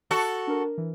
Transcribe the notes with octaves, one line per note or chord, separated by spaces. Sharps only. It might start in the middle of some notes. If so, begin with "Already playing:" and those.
F#4 A4
D4 A#4
E3